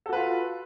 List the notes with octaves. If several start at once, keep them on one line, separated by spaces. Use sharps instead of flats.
F4 F#4 A4 B4